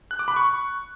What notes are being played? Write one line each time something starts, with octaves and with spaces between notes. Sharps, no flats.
F#6
D6
B5
C#6